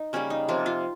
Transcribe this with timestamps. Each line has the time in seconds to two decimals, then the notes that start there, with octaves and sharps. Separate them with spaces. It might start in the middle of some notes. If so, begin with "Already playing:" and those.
Already playing: D#4
0.13 C#3 G3 A#3 C#4
0.30 D#4
0.48 C3 F3 A#3 F4
0.66 F4